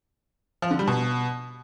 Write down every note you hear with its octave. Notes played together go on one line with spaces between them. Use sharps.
F3
D3
G3
B2